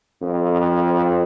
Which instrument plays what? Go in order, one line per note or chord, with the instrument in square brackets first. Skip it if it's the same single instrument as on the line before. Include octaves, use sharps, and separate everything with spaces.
[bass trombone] F2